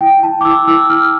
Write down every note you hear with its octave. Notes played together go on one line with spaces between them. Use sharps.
E4 G5
E4 A5
D6
E4 E6
E4 E6
E4 F6